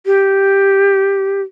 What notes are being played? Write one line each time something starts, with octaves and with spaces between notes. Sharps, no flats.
G4